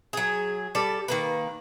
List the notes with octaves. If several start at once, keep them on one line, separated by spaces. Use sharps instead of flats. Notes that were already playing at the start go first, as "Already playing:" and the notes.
F#3 G#4
G3 A4 D5
D#3 A#3 B4